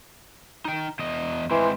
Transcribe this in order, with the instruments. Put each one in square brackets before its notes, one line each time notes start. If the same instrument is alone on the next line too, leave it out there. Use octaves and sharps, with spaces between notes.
[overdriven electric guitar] D#4 G5
E2 D#5
[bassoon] E3 [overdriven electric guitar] G#3 C4